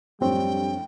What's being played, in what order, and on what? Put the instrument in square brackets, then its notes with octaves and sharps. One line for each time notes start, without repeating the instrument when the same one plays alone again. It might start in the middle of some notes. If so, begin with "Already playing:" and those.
[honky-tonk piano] A#1 A2 F3 [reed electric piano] F#2 C4 C#5 [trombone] G3 [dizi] G5